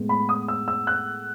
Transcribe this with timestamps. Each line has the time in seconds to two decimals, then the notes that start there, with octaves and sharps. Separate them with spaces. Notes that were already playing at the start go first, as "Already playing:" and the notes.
Already playing: A2 G#3 B3
0.09 B5
0.29 D#6
0.48 E6
0.68 E6
0.87 F#6